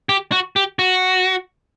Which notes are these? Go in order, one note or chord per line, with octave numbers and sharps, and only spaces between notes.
G4
F#4
G4
F#4